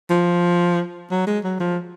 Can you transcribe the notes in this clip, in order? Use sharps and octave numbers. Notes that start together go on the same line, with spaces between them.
F3
F#3
G#3
F#3
F3